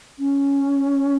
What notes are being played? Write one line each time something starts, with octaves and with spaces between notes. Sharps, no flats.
C#4